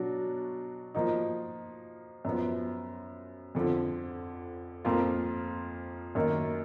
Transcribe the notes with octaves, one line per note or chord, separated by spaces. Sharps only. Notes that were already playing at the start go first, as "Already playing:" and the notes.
Already playing: B2 F#3 D4 F#4
F3 A#3 D#4 F#4
F#2 F3 B3
F2 D3 F3
F2 F3 A#3 F4
F#2 D#3 A#3